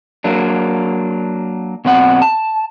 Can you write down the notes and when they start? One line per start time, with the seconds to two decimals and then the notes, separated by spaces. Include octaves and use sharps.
0.24 F#3 A#3 D4
1.85 B2 F#3 C4 F#5
2.22 A5